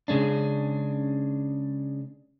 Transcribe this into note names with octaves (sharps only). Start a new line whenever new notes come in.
C#3 G#3 C#4 D4